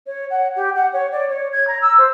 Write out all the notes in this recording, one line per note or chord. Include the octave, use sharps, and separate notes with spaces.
C#5
F#5
G4
F#5
C#5
D5
C#5
G#6
A#5
E6
C5